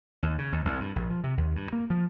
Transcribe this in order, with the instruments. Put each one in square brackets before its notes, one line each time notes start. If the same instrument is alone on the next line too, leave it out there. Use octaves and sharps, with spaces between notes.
[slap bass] D#2
C#3
D#2
C2
G2
A#1
F3
C3
D#2
G2
A#3
F3